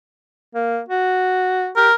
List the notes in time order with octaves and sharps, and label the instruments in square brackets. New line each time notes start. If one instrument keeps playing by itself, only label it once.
[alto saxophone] A#3
F#4
[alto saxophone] G4 [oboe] A#4